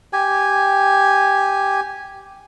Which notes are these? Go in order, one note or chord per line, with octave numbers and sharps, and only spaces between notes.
G4 G#5